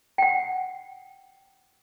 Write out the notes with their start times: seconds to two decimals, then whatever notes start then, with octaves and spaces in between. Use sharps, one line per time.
0.18 F#5 G5